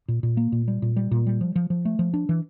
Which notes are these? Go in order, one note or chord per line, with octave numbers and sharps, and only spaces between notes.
A#2
A#2
A#3
A#2
G3
A#2
G3
A#2
G3
F3
F3
F3
A3
F3
D4
E3